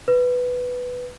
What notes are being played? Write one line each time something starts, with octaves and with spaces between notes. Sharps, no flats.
B4